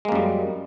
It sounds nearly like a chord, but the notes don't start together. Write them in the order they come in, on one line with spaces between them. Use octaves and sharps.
G#3 A#3 F#2 G3